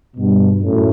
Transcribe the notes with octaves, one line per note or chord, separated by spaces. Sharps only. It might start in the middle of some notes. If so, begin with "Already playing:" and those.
G2 B2
F#2 A2